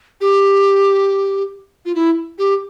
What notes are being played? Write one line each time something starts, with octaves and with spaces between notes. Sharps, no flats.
G4
F4
E4
G4